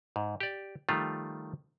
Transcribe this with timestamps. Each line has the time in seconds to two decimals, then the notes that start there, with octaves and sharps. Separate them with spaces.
0.16 G#2
0.41 G4 D5
0.89 D#3 F3 G3 A3 F4